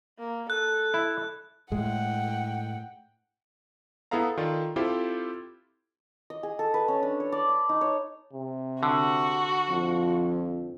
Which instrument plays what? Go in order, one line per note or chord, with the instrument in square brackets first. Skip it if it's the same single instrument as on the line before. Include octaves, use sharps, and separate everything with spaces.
[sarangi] A#3
[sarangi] A4 [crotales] F#6
[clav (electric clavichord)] E4
[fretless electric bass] A2 G#3 [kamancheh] F#5 G5
[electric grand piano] B3 E4 G#4 A4 F5 A#5
D#3 F4 A4 D5
C4 E4 F4 G4 A4 C5
[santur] D#5
G#4
A4
B4
C#4
D4
C#5
D5
D6
D#4
C#5
[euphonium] C3
[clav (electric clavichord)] D3 [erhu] F#4
[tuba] F2 [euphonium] F3